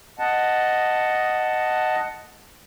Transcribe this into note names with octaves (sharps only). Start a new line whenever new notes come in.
D#5 F#5 A5